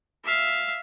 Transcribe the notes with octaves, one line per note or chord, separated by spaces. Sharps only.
E5 F5